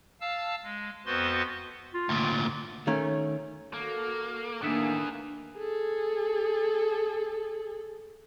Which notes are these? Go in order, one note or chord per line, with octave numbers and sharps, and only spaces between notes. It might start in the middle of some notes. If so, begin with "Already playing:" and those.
F5 A5 E6
G#3
F2 B3 F#4 B4 C5 C6
F4
D2 A#2
D#3 A3 C#4 C#5
A#3 F#4 A4
A2 D#3 A#3 B3 D4 G#4 E5
G#4 A4